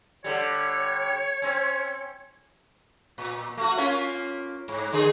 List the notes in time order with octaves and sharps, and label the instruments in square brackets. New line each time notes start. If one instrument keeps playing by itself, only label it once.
[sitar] D3 G3 [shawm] C#5
[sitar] C4 C#4
A#2
A3 F#4
A#3 C#4 F4
G#2
D3 G#4